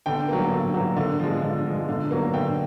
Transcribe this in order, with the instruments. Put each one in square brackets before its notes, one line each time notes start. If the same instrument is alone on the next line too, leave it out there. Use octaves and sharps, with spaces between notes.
[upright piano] D3 G5
F#3 A#3
D3
F#3 A#3
D3
F3 G#3
D3
F3 G#3
D3
F#3 A#3
D3 G5